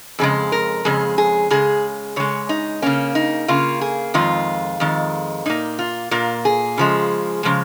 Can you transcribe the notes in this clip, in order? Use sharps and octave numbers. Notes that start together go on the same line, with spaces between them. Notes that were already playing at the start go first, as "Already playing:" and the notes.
F2 C#3 G#3 G#4
A#4
F2 C#3 G#3 G#4
G#4
C#3 G#3 G#4
C#3 G#3 C#5
D#4
C#3 A#3 C#4
D#4
C#3 A#3 F4
G#4
F2 D#3 G#3 F4
F2 D#3 G#3
A#2 A#3 D#4
F4
A#2 A#3 F4
G#4
C#3 F3 G#3
C#3 F3 G#3